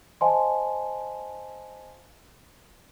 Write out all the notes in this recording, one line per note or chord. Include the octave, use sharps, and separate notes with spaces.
C5 D#5 F5 G#5 A5 C6